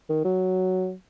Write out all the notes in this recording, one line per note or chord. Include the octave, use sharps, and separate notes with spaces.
D#3
F#3